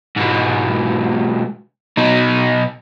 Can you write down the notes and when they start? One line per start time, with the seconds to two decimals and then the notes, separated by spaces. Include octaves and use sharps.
0.16 G#2 B2
1.97 B2 D#4